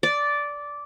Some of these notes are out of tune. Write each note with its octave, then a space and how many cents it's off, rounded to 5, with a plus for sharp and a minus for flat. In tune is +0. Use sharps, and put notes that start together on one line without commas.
D5 -10